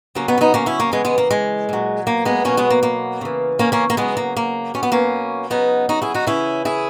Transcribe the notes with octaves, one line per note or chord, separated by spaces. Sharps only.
C#3 F#3 A#3 C#4
B3 D#4
C#4
B3 D#4
A#3 C#4
C#4 E4
A#3 C#4
C#3 E3 G#3 B3
G#3 B3
A#3
G#3
A#2 F#3
A#3
G#3 B3
B2 F#3 A#3 C#4
G#3 B3
A#3
A#3
C#3 E3
A#3 C#4
A#3 C#4
A#3
C#3 F#3 G#3 B3
A#3
A#3
B2 F#3 C#4
B3
A#3 C#4
C#3 F#3 B3 D#4
D#4 F#4
E4 G#4
D#4 F#4
C#3 E3 C#4 E4
E4 G#4